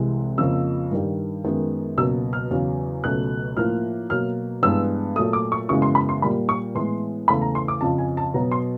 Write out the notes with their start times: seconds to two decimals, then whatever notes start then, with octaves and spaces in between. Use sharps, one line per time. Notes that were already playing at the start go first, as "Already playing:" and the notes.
Already playing: C2 C3 E3 G#3
0.38 F2 C#3 F3 A#3 E6
0.91 G2 D#3 G3
1.44 F#2 D#3 G#3 B3
1.97 C#2 B2 F#3 A#3 E6
2.33 F6
2.51 E2 C#3 F#3
3.04 C#2 B2 F#3 A3 F#6
3.57 A2 F3 A#3 F6
4.10 B2 F#3 A#3 F6
4.63 G2 E3 G#3 B3 E6
5.16 A#2 F#3 A3 D#6
5.33 D6
5.52 C#6
5.69 F#2 C#3 E3 G#3 B3 C#6
5.82 C6
5.95 B5
6.09 C6
6.22 A#2 G3 A#3 B5
6.49 C#6
6.75 A2 E3 G#3 B3 C6
7.28 E2 C#3 E3 A3 B5
7.42 A#5
7.55 C6
7.68 D6
7.81 F2 C#3 F3 A5
7.98 G#5
8.17 A5
8.34 B2 F#3 B3 A#5
8.52 C6